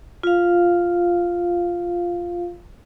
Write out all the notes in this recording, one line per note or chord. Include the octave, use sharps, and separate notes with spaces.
F4 F5